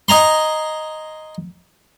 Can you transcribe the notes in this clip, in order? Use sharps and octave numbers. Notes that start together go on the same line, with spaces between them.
D#5 G#5 A#5 C6